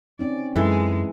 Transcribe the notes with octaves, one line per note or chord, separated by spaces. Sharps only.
C4 C#4 D#4 D5
F#2 E3 G#3 A4